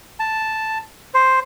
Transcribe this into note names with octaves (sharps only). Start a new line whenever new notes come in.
A5
C5